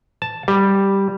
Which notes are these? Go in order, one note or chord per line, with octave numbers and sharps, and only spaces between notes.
A5
G3